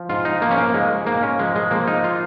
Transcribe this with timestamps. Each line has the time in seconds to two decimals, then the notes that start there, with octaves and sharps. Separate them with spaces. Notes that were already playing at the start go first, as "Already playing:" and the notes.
Already playing: F3
0.09 G#2 F4
0.25 D#4
0.42 F3 A#3
0.51 C#4
0.58 A#3
0.74 G#2 G#3
1.06 G#2 A#3
1.23 C#4
1.39 F3 G#3
1.55 G#3
1.71 F3 A#3
1.87 D#4
2.04 F4